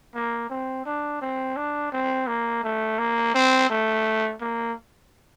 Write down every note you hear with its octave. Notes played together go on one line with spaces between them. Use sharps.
A#3
C4
D4
C4
D4
C4
A#3
A3
A#3
C4
A3
A#3